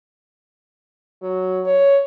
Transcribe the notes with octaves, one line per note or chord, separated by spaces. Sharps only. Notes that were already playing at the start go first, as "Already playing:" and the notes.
F#3
C#5